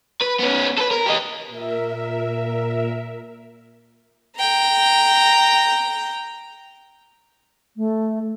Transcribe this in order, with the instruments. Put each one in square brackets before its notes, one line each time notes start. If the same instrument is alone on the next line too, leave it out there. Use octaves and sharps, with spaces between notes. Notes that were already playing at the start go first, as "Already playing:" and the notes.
[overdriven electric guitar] B4
B3 C#4
A4 B4
A#4
G4 D#5
[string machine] A#2 A#4 E5
[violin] G5 A#5
[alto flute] A3